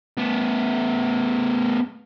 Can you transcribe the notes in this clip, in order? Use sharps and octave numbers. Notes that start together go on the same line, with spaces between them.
A3 B3